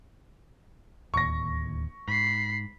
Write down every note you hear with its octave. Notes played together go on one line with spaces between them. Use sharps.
D1 D#2 C#6 A#6
G#2 B5 C7